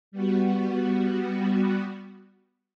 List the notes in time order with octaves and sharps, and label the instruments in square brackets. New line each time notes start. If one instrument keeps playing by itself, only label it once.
[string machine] G3 B3 F#4